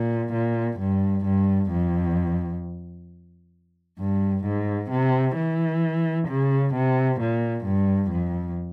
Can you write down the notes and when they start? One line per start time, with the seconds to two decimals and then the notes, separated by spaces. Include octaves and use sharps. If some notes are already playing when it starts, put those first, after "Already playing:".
Already playing: A#2
0.33 A#2
0.79 G2
1.25 G2
1.71 F2
3.99 G2
4.45 G#2
4.91 C3
5.36 E3
6.28 C#3
6.74 C3
7.20 A#2
7.65 G2
8.11 F2